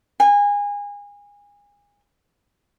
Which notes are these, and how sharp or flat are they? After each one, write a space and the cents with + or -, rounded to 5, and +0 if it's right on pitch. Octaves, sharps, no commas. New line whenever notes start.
G#5 -25